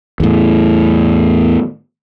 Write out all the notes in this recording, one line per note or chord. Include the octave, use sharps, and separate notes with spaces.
E2 A2